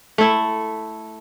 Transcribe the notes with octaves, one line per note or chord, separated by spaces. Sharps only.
A3 E4